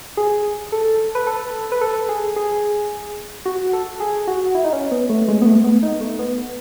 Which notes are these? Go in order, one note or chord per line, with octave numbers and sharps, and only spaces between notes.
G#4
A4
B4
A4
B4
A4
G#4
G#4
F#4
A4
G#4
F#4
E4
D#4
C#4
B3
A3
G#3
B3
A3
B3
D#4
A3
B3